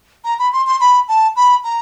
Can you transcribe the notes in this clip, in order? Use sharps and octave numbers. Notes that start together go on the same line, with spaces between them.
A#5
B5
C6
C6
B5
A5
B5
A#5